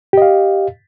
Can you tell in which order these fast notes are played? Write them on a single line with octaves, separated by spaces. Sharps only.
G4 D#5 F5